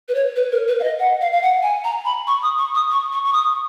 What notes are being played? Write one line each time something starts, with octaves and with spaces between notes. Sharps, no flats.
B4
C#5
B4
A#4
B4
F5
D#5
F#5
F5
F5
F#5
G#5
A#5
B5
C#6
D#6
C#6
D#6
C#6
C#6
C#6
D#6